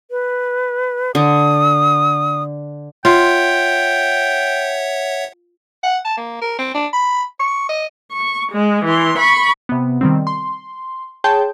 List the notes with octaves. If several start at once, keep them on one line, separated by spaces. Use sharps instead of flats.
B4
D3 D#6
F4 C#5 E5 F#5 G5
F#5
A5
A#3
A#4
C4
D4
B5
C#6
D#5
C#6
G#3
E3 C6
B5 C#6
C3 B3
D#3 G3 C4
C6
G#4 C#5 G5 A5 C6 G6